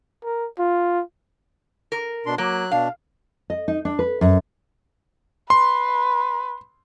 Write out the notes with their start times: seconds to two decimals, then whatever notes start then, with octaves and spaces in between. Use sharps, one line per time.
0.24 A#4
0.58 F4
1.92 A#4
2.26 B2 D4 C6
2.38 F#3 A#3 F#6
2.71 B2 D4 F5
3.50 D#5
3.68 D#4
3.85 D4
3.99 B4
4.21 F#2
5.50 B4 C6